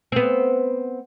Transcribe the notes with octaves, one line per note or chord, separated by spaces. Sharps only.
B3 C4